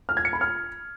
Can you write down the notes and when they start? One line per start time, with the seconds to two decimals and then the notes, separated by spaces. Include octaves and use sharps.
0.09 F6
0.17 G#6
0.25 C#7
0.33 B5
0.41 F6